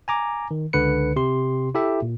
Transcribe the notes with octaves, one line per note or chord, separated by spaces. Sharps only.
G#5 A#5 D6
D#3
C#2 D3 B4 C#7
C3 G4 C6
E4 G4 A4 E5
A#2